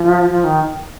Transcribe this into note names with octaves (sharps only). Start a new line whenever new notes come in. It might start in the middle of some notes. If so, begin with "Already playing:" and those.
Already playing: F3
F3
D#3